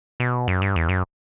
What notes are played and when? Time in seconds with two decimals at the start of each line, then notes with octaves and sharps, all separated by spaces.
0.20 B2
0.48 F#2
0.62 G2
0.76 E2
0.89 F#2